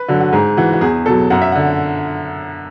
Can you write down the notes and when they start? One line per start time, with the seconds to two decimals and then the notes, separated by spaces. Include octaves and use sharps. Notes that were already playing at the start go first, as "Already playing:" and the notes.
Already playing: B4
0.08 D3 F#3
0.20 F#4
0.33 G#2 G#4
0.57 E3 F#4
0.73 F#4
0.81 E2 G#4
1.06 B2 F#3 A4
1.30 F#2 F#5
1.42 E5
1.52 F#5
1.55 D3